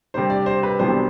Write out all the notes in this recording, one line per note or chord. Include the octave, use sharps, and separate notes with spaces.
C3 G3 D4 C5
D5
C5
B4
C2 C3 F#3 B3 D4 C5